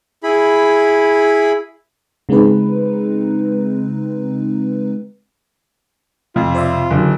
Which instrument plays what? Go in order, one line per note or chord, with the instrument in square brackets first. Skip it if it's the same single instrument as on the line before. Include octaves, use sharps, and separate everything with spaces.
[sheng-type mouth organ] E4 G#4 B5
[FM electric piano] C#3 G#3 C4 D#4 B4
[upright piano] F2 [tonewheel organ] C3 [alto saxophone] F4
[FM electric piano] C5 D5 E5
[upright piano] F#1 [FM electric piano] F#2 D3 F#3